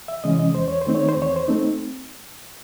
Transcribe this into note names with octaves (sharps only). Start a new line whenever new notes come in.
E5
C3 E3 G#3 C#4 D#5
D#5
E2 C5
C#5
C5
D#3 A3 C4 D#4
C#5
C5
E2
C#5
C5
A3 C4 D#4